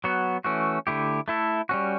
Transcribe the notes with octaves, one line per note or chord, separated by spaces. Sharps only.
F#3 B3 F#4
E3 A3 C#4 F#4
D3 A3 E4 G4
A3 E4 A4
G3 C#4 F#4